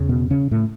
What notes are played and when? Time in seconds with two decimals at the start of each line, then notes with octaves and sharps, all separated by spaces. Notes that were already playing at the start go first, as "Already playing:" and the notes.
Already playing: E2 C#3
0.09 B2 B3
0.30 C#3 C#4
0.51 A2 A3